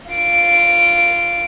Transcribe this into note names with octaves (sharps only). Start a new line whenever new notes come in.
F4 D7